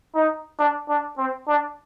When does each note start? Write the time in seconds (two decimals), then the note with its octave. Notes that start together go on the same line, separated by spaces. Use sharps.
0.15 D#4
0.59 D4
0.89 D4
1.18 C4
1.48 D4